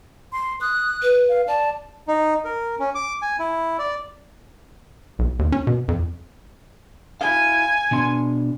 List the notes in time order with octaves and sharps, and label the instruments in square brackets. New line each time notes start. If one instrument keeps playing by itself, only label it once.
[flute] C6
[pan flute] D#6 [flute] F#6
[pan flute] B4
[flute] F5
[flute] D5 [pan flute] A5
[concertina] D#4
A#4
C#4
D6
G#5
E4
D5
[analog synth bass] B1
D#2
C#4
B2
F2
[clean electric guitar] E4 F5 [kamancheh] G#5
[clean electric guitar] B2 D4 C6